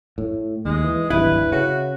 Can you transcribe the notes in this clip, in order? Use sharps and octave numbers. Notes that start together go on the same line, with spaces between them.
A2
D#2 G#3
E3
D1 G#1 G2 E4 B4
C#3 F#4